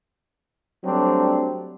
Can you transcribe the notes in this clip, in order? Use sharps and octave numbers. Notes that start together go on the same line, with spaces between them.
F#3 G3 A3 C4 D4